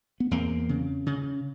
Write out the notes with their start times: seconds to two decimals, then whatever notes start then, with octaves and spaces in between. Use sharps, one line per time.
0.20 B3
0.31 E2 A#3 C4
0.69 C#3
1.06 C#3